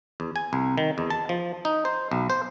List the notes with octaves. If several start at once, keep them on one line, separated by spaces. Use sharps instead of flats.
E2
G#5
C2
D#3
E2
A5
F3
D#4
C5
B1
C5